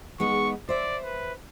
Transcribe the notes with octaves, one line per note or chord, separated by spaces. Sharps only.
G#3 B3 D#4 C#6
C5 D5 E5
B4